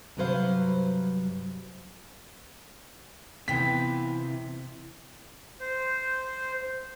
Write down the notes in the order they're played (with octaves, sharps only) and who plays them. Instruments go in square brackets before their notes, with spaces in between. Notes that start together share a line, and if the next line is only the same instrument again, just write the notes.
[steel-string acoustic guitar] G2 C3 F#3 B4 C5 F5
[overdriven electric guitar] C3 [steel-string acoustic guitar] E3 F4 [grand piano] B3 G5 B6
[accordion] C5